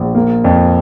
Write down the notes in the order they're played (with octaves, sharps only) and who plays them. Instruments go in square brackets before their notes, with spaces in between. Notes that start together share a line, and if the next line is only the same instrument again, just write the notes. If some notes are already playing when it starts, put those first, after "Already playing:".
Already playing: [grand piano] A#1
A#3
F2